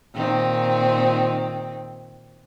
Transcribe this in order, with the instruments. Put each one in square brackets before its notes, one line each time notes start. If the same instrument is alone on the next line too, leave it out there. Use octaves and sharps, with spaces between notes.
[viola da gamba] A#2 D#3 C4